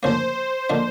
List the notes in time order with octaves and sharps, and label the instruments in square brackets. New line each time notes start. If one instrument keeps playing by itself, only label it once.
[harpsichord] D2 C#3 F3 A#3 [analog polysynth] C5
[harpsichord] D3 F3 A#3 D#4